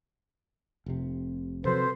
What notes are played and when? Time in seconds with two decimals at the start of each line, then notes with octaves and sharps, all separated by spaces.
0.86 F1 C3
1.65 C3 F3 F#3 A4 B4 C5